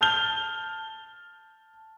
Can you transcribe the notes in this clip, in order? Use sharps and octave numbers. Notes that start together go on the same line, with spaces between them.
A5 F6 G6 F7 G7